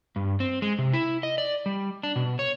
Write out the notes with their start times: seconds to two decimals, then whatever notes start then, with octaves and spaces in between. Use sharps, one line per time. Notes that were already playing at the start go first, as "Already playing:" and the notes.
0.16 G2
0.40 C4
0.62 G#3
0.79 C3
0.94 E4
1.23 D#5
1.38 D5
1.66 G3
2.03 D4
2.16 B2
2.39 C#5